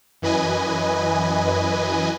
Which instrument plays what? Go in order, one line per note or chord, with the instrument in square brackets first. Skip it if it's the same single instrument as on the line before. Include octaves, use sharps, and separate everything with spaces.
[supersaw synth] F#2 E3 B4 D#5 G#5